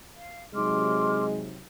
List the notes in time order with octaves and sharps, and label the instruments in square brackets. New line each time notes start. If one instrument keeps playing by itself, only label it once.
[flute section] F5
[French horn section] C3 F#3 D#4 [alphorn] G#3 [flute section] C6 D6 F6